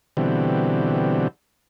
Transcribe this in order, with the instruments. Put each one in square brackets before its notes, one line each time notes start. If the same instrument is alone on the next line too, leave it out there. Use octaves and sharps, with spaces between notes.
[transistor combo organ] B2 D3 E3 G3 C4